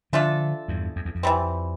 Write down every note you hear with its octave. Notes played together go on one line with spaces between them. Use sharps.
D3 F3 A3 D4 F4 A4
E2 G2
F2
E2
F2
E3 G3 C4